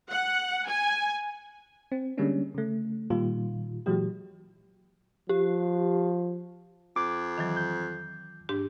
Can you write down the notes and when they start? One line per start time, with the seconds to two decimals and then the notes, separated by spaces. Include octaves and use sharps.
0.10 F#5
0.68 G#5
1.92 C4
2.17 D3 G3 G#3 A#3 C#4 D4
2.54 C#3 A3
3.10 A#2 D#3 G3 F4
3.86 A#2 E3 F#3 G#3 G4
5.29 F3 G4
6.96 F2 D6
7.38 D#3 E3 F#3
7.57 G6
8.49 G#2 D4 G4